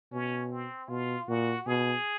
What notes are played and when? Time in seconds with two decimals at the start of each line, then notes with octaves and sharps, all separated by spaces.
0.12 B2 C#4
0.52 C4
0.89 B2 F4
1.28 A#2 F#4
1.66 B2 G#4